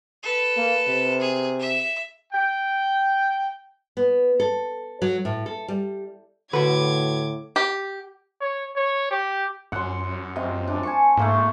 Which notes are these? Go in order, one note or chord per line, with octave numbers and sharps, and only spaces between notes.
A4 B4
A#3
C3
G#4
E5
G5
B3
A4
F#3
A2
A4
G3
A2 D3 F#4 B4 D6 G#6
G4
C#5
C#5
G4
F#2 F#5 C6
C3 F4 D#5
D4
G#5 A5 C#6
G#2 A3 A#3 C#6